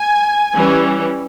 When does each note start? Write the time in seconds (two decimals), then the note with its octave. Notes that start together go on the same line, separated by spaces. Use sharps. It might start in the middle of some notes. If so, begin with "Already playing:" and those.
Already playing: G#5
0.55 E3 G3 C#4